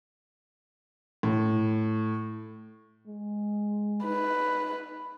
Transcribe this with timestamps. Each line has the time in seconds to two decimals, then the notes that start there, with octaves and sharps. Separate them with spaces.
1.23 A2
3.07 G#3
4.04 D#4 B4